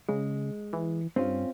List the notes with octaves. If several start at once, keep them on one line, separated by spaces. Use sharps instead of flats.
C#3 G#3
E3
G2 C4 C#4 F4